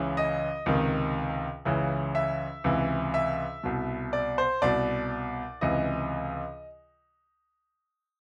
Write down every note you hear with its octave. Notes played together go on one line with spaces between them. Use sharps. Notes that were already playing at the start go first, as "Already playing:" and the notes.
Already playing: C#2 C#3 E3
D#5
C#2 C3 D#3
C#2 C#3 E3
E5
C#2 C3 E3
E5
C2 B2
D5
C5
C2 B2 D5
C#2 C3 E3 D#5